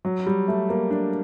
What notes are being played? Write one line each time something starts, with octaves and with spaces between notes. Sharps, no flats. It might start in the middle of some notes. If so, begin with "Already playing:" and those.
F#3
G3
A3
A#3
D4